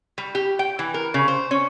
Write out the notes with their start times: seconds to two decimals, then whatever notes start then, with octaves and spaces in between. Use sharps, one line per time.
0.18 G3
0.35 G4
0.59 G5
0.79 E3
0.94 A#4
1.14 C#3
1.28 C5
1.51 C#4